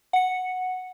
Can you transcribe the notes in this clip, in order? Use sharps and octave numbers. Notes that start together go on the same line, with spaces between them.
F#5 C#7